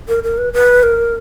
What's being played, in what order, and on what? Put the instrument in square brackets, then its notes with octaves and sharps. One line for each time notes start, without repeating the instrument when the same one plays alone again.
[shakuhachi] A#4
A#4
B4
B4
A#4